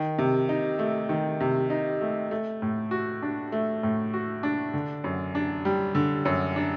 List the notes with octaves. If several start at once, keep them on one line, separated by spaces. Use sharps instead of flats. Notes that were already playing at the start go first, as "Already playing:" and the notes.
Already playing: D#3
C3
D#4
A3
D#3
C3
D#4
A3
A3
A2
F#4
D4
A3
A2
F#4
D4
D3
F#2
D4
G3
D3
F#2
D4